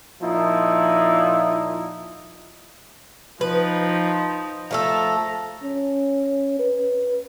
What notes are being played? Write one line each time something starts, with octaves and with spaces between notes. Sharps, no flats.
A#2 F3 D#4 E4
F3 D#4 B4
F3 A3 A4 A#5
C#4
B4